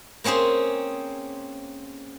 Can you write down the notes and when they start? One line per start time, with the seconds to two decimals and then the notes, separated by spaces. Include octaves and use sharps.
0.24 A#3 C4 C#4 G#4 C5